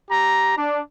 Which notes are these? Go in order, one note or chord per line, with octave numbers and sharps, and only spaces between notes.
G4 A#5
D4